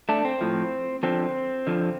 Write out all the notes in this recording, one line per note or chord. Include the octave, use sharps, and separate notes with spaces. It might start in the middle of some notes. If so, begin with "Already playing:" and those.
A3 D4
C4
A2 F3
F2 D3 F3 C4
F2 D3 F3